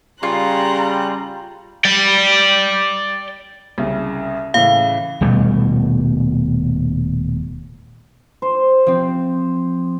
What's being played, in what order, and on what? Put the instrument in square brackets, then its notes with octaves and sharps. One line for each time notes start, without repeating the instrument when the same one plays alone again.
[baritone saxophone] C#3 [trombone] G3 [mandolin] F4 [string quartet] A#5 C6 F#6
[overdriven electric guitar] D5 G5
[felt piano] C2 C#3
[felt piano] A2 C#3 E3 [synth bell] F5
[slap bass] D#1 B2 G3 A3
[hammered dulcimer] C5
[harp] F3 C4